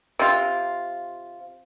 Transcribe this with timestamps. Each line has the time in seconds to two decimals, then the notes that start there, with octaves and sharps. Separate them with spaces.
0.19 C3 F4